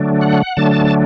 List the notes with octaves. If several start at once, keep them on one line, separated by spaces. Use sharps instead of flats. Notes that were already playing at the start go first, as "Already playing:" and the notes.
Already playing: D3 F#3 A3 D4
F#5
D3 F#3 A3 D4 A5